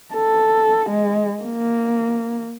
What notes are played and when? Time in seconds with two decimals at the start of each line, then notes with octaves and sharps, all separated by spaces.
0.15 A4
0.90 G#3
1.43 A#3